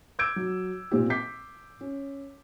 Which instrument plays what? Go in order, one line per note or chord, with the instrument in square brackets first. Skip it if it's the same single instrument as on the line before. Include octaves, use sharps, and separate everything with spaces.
[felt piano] D6 E6 G6 G#6 D7
F#3
A#2 C4 G4
D6 G6 B6 C7
C#4